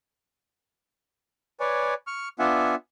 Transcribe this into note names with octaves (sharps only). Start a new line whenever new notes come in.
B4 C#5 D5 G#5
C#6 F6
B3 D4 F4 E5 F#5 G#5